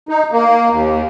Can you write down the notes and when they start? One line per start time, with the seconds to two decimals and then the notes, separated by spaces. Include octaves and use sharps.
0.09 D#4
0.32 A#3
0.69 D#2